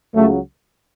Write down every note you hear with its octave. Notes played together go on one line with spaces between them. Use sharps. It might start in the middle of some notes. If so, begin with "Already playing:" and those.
C#2 C#3 F#3 A3